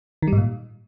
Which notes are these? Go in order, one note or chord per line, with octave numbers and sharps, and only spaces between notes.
D#3
G3
G#2
A#2